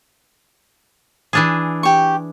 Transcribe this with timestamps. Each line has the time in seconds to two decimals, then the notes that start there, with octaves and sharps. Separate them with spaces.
1.33 E3 D4 G#4
1.83 G4 C#6